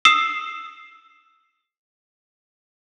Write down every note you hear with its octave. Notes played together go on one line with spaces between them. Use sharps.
D#6 E6 C7 E7